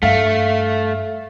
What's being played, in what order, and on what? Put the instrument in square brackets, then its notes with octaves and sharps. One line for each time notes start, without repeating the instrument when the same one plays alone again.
[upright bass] G2 [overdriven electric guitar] A3 [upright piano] E5 F5